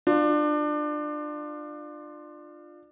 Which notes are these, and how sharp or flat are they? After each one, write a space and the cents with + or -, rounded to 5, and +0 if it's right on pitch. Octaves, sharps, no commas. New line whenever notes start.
D4 +25 F4 +0